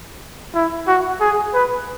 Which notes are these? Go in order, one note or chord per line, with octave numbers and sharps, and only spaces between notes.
E4
F#4
G#4
B4